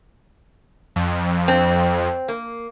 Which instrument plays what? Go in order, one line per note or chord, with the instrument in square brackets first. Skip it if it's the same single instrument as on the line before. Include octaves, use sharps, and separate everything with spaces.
[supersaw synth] F2
[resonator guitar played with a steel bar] C4
A#3